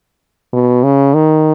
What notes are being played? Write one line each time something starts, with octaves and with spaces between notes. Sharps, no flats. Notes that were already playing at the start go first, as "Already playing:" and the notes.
B2
C#3
D#3